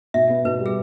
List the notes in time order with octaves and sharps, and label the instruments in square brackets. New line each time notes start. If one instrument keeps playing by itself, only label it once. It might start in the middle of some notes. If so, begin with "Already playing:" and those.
[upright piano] B2 [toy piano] E5
[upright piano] B3
[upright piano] B2 [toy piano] B4
[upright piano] G3
[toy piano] G#4